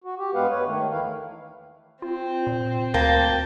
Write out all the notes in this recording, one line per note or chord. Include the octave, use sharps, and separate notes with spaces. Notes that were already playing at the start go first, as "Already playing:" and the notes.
F#4
G4
G2 G#3 B3 B4 F5 F#5
B4 C#5
D#3 A3
D#2 E3 E4 F5
C4 F4
A#2
D2 A#3 G5 A5